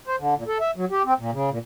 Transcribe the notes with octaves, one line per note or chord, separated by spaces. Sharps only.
C5
D3
A#2
A4
E5
F#3
G4
C4
A#2
C#3
A#2